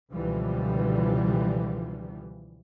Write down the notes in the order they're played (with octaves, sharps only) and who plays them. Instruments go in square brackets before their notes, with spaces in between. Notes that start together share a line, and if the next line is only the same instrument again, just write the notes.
[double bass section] C#2 B2 D3 E3 F3 G3